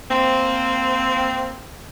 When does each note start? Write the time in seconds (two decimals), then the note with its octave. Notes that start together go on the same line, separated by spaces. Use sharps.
0.11 A#3 C4